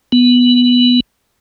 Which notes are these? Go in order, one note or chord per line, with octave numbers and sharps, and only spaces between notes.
B3